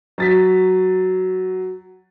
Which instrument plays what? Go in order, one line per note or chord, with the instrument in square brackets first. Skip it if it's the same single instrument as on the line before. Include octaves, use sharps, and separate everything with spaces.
[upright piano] F#3 A6 B6